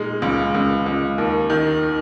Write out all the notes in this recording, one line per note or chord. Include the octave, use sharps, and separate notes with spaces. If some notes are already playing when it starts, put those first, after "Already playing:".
Already playing: A#2 G#3 D#4
C#2
C#2
C#2
D#2
D#3